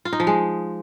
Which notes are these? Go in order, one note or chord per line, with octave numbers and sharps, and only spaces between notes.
F4
D#4
F3
G#3